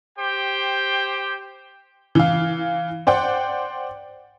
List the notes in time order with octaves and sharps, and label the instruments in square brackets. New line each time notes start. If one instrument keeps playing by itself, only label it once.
[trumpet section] G4 C5 G5
[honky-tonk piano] E3 F5
C5 D5 F#5 G5